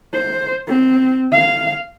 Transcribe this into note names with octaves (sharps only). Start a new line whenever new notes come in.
C5
C4
F5